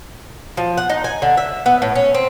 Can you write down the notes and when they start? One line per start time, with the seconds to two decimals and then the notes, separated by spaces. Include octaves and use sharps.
0.57 F3
0.77 F#5
0.89 D#4
1.04 G#5
1.22 D3
1.37 E5
1.66 B3
1.82 A2
1.95 C#4
2.14 C4